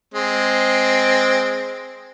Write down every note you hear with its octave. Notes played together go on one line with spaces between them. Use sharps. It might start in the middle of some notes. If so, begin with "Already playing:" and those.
G#3 C4